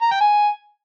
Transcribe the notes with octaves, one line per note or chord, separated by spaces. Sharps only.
A#5
G5
G#5